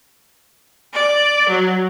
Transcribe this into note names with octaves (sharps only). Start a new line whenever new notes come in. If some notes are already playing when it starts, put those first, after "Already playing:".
D5
F#3